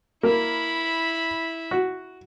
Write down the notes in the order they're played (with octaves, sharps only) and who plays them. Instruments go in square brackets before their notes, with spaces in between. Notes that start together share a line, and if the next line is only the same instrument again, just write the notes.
[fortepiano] A#3 A#4 [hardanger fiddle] E4 B5
[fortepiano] F#4